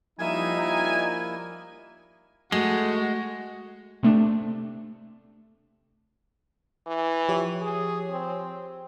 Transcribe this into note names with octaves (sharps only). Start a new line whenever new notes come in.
F3 G3 A#3 D#4 E4 A#4 E5 G#5
G#3 A3 F#4
C3 A3 D4
E3
F3 G4 C#5
G#4
C4